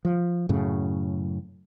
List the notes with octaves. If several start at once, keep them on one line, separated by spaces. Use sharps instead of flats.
F3
F#2 A2 C#3